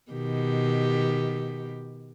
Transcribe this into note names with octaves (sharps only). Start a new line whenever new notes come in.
B2 D#3 G4